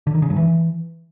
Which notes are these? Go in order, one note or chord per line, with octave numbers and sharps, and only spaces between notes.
D3
D#3
C#3
G2
E3